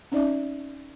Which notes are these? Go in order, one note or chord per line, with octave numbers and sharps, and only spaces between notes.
C4 C#4 D#4 D5 E5